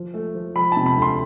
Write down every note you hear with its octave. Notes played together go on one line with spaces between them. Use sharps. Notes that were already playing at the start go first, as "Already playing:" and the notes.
Already playing: F3
A3
F3
F3 B5
C3 A5
B5
D2
C6